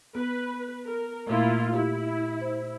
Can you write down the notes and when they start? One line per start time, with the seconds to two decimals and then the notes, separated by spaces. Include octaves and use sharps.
0.15 B3 B4
0.87 A#4
1.27 A#2 A3 A#3 E4 F4
1.73 E4 G4
2.41 C5